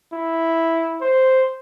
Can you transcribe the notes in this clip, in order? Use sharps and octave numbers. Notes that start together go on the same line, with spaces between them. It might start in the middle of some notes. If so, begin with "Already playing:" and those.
E4
C5